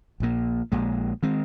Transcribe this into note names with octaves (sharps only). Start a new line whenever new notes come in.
A#1 A#2 A#3
A#1 A#2 G#3
D#3 G#3 C4